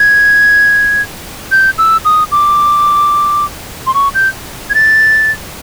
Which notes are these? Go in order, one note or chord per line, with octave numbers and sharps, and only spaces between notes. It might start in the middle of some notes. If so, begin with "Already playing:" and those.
Already playing: G#6
G6
E6
D#6
D6
C6
C#6
G6
G#6
A6